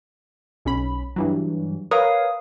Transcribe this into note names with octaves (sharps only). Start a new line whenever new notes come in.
B1 C#4 B5
G2 E3 F#3
A#4 B4 C#5 F5 D#6